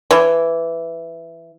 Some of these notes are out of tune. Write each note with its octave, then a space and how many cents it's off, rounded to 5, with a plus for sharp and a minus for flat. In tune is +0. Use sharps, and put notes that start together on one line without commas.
E3 +10